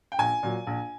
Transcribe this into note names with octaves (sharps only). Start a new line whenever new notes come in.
G5
A#1 G#5
A#2 F#3
A#1